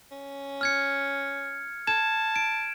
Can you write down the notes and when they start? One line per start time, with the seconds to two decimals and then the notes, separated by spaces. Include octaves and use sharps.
0.11 C#4
0.61 F6 G#6 C#7
1.87 A5 G#6 E7
2.36 D7